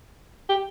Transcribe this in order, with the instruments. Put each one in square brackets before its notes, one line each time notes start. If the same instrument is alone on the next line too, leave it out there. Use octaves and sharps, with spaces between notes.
[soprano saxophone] G4